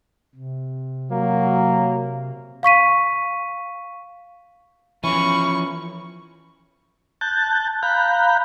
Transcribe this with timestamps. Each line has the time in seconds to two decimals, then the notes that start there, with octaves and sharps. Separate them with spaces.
0.35 C3
1.11 F#3 A#3
2.63 F5 C#6 B6 D#7
5.04 E3 F3 C#4 B5 C#6
7.21 A5 F#6 G6 A6
7.83 F5 A#5 B5 F#6 G6